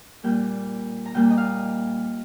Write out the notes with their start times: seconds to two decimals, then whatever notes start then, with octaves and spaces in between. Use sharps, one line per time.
0.24 A#2 G3 A#3 G5
1.06 A#5
1.14 A#2 G3 A#3 G5
1.30 D#5
1.37 F5